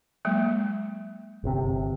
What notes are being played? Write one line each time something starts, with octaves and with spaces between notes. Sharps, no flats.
F#3 G#3 A#3
G1 C3